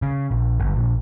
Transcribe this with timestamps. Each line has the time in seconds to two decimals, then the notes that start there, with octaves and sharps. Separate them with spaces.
0.02 C#3
0.31 A#1
0.60 G1
0.76 A#1